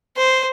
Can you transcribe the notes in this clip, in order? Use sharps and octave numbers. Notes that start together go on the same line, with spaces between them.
C5